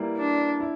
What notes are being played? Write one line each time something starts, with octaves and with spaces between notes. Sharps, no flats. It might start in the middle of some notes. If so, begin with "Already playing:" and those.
Already playing: E3 G3 A#3 E4
D4
E4